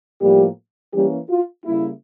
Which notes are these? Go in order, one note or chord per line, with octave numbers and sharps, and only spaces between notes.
A2 F3 G3 A#3 G4
E3 G3 A#3 C#4 G4
F4
C#3 G3 A#3 E4